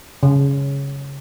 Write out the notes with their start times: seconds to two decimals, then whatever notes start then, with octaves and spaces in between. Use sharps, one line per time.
0.23 C#3